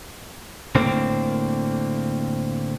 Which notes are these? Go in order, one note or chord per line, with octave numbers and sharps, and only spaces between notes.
A2 D3 A#3 C4